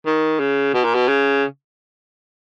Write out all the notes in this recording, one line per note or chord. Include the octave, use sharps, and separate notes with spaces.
D#3
C#3
B2
A#2
B2
C#3